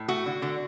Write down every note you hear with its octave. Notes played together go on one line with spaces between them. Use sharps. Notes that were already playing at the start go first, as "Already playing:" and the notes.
Already playing: A2
A3 F#4
D3
D3